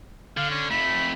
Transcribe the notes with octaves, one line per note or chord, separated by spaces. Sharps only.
D3 F5
C#4
F2 A3 B5